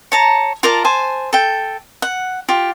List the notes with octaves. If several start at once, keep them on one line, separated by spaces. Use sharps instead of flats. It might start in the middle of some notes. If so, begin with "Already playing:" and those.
C#5 A5 A#5
F4 A#4 D5 A5
C5 G#5 A5
A4 G5
F#5
F4 G4